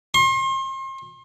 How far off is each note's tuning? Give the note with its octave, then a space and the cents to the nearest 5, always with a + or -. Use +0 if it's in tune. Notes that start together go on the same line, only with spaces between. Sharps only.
C6 +40